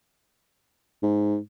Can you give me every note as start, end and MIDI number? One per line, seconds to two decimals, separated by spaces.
1.03 1.37 44